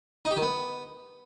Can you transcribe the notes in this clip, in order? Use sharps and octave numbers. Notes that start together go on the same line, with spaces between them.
D#4
G4
D#3
B3